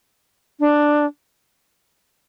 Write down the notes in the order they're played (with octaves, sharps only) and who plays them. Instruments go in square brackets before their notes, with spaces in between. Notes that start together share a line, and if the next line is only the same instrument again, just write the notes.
[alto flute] D4